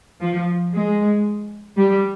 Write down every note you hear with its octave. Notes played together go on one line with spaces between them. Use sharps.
F3
G#3
G3